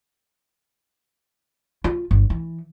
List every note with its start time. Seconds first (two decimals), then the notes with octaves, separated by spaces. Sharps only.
1.84 F4
2.11 G1
2.30 E3